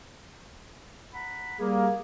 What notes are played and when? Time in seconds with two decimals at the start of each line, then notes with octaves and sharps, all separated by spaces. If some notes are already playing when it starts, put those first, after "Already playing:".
1.14 F#5 A#5 B5
1.59 G3 A#3 G#4